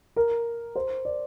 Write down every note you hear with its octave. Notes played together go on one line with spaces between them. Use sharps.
A#4
C5
D5